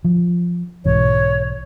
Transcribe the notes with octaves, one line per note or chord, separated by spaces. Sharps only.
F3
B1 G#2 E3 C#5